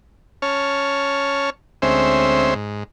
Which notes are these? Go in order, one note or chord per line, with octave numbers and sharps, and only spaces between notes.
C#4 C#5 A5 F6
D2 G#3 C4 C#4 C5 E5
G#2